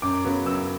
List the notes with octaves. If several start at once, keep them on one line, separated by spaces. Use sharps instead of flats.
F#2 D6
C#3 F#3 B3
F#2 E6